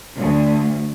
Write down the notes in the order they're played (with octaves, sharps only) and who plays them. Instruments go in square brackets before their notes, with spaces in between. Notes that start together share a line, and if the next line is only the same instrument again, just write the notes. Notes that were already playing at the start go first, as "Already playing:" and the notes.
[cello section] D2